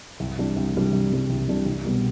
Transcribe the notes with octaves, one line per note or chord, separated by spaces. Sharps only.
C2
C3 E3 G3 D4
C2
C3 E3 G3 D4
C2
C3 E3 G3 D4
C2
C3 E3 G3 D4
C2
B2 G3 B3